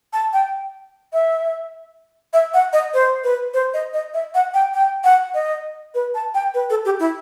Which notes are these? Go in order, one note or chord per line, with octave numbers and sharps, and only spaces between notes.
A5
G5
E5
E5
F#5
D#5
C5
B4
C5
D#5
D#5
E5
F#5
G5
G5
F#5
D#5
B4
A5
G5
B4
A4
G4
E4